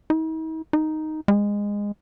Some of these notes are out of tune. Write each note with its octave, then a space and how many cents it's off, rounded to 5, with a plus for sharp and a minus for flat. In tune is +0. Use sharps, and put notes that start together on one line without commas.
D#4 +45
D#4 +0
G#3 -20